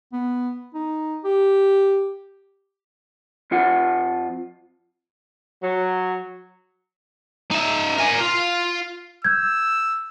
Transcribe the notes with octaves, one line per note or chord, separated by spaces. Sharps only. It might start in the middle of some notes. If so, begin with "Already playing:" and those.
B3
D#4
G4
F2 F4 F#5
F#3
D#4 E5
A#4 G#5
F4
E6 G6 G#6